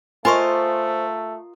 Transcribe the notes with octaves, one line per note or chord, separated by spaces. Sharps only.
A3 F4 A#4 C5 D#5 G#5 C6 C#6